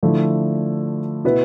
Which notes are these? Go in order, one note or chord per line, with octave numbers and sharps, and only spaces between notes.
D3 F3 A3 E4 A4
B2 B3 E4 B4